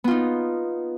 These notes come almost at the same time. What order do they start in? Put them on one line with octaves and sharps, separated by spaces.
B3 F4 D#4